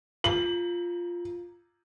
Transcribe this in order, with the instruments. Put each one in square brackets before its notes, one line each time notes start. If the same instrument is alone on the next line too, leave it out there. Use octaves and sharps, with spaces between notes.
[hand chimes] F4 A#5 [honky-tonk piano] F#7